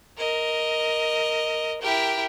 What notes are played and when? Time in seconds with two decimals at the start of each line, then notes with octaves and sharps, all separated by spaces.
0.19 A#4 D#5
1.82 E4 G4 A#4 G5